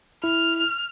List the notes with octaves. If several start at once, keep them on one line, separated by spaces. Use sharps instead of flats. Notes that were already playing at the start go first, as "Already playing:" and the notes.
E4 F6